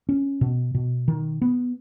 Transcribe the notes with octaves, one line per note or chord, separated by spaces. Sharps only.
C#4
B2
B2
D#3
B3